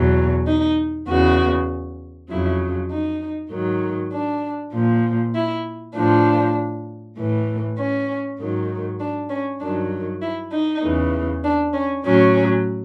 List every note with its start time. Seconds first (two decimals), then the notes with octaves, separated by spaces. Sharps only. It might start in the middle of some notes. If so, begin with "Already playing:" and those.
Already playing: E2 B2 F#3
0.47 D#4
1.08 E2 C#3 E3 F#4
2.30 F2 C#3 F#3 E4
2.91 D#4
3.52 G#2 D#3 F#3
4.13 D4
4.73 A#2 F3
5.34 E4
5.95 A2 F3 D4
7.18 A2 E3
7.78 C#4
8.39 G#2 D#3 F#3
9.00 D4
9.30 C#4
9.61 G2 D#3 F#3 D4
10.22 E4
10.52 D#4
10.83 E2 C#3 E3
11.44 D4
11.74 C#4
12.05 A2 F#3 C#4